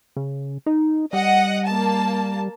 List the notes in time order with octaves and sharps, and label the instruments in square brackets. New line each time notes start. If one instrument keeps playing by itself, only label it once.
[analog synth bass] C#3
D#4
[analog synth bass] G3 [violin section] D#5 F#5
[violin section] A#3 A5